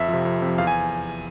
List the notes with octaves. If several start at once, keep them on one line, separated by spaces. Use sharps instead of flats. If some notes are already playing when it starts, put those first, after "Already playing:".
Already playing: F2 E5
C3 F3
F2
C3
F3
E2 F5
G#5